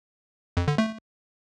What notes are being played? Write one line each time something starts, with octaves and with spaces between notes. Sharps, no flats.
F2
D3
A3